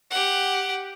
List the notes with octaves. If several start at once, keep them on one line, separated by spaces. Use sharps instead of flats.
G4 F#5